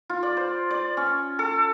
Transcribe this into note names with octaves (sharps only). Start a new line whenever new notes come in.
F4
D5
C5
D5
C#4
A4